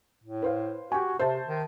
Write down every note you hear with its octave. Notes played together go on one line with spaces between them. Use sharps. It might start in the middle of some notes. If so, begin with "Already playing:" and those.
A2
B4 C5 F5
F#4 G4 G#5
C3 C5 E5 A5
D#3